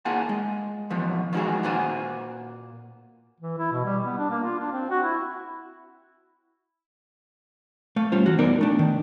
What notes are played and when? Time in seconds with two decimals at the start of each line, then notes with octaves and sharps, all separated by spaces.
0.05 A#3 F4 G#4 F#5 G#5 A5
0.29 G#3
0.90 E2 B2 F3 F#3
1.33 D#3 F3 G#3 E4 F#4 G#4
1.63 A#2 A#3 F#4 C5 G#5
3.40 E3
3.58 E4
3.72 B2
3.84 G3
4.06 B3
4.18 D4
4.31 A#3
4.43 F4
4.59 D4
4.72 C4
4.90 F#4
5.03 E4
7.96 A3 F5
8.12 G3 C#4 F4 C5
8.26 E3 F#4
8.38 B3 D#4 A#4 D5
8.61 A3 D4
8.79 D#3